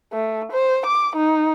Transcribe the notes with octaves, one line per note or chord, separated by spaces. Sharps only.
A3
C5
D6
D#4